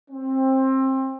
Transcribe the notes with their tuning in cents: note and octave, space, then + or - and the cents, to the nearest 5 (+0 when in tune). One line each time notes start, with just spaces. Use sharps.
C4 +25